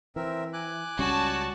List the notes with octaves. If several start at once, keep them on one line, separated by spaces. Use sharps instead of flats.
E3 C4 A#4 E5
G#5 D6 F#6
C#2 G3 C#4 F#4 A5